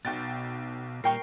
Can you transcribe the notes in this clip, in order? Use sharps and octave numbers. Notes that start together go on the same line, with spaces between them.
B1 B2 G5 A6
A#2 G3 A#4 G5 C#6 C7